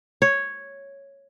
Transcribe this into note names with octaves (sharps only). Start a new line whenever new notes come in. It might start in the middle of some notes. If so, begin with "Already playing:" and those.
C#5